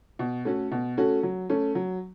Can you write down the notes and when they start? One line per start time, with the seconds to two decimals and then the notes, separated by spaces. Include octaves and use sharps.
0.19 B2
0.45 A3 C#4 F#4 A4
0.71 B2
0.97 A3 C#4 F#4 A4
1.23 F#3
1.50 A3 C#4
1.75 F#3